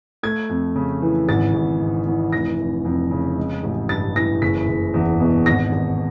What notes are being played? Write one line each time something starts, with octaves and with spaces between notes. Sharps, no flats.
A3 G#6
F2
C#3
E3
G#1 A6
G#1
G#2
E3
F1 A#6
F1
F2
C#3
G#3
A1
G2 A6
E3 A#6
F#1 B6
F#1
E2
B2
G#1 A#6
G#1